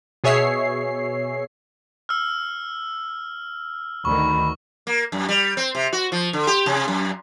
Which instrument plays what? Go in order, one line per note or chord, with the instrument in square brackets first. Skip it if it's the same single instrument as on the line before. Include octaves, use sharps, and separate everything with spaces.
[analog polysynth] B2 G#4 C#5 E5 C7
[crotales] E6 F6
[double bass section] D2 D#3 [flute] B5 [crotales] C#6
[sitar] A#3
F#2
G3
C4
C3
F#4
F3
D3
G4
C3
F#2